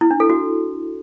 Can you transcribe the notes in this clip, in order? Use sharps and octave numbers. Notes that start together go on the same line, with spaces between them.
E4
D4
A4
F#4